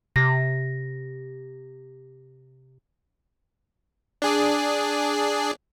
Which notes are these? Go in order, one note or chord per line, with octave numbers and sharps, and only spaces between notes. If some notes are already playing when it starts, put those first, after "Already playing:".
C3 A#6
D4 G#4 D5